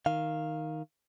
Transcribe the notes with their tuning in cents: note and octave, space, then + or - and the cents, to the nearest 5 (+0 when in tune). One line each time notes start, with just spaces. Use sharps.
D#3 +0 F5 +0